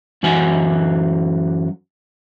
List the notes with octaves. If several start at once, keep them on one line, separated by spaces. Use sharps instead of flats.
F#2 E3 F#4 F#5 G#5